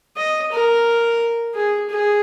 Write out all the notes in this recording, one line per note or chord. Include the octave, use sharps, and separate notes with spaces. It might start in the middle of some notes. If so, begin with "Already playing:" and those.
D#5
A#4
G#4
G#4